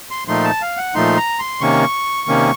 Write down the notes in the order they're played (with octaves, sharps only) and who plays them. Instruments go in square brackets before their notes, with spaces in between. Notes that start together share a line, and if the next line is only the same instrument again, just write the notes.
[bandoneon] C6
A#2 F3 A3 D#4 C6
A5
F5
F#5
A#2 F3 A3 D#4 C6
A#5
C6
C3 D#3 A#3 C#4 C#6
C3 D#3 A#3 C#4